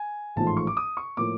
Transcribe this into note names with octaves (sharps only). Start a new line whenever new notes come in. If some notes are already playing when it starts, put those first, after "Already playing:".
Already playing: G#5
A1 G#2 F3 A3 A5
C6
C#6
D6
D#6
C#6
A2 F3 A#3 D6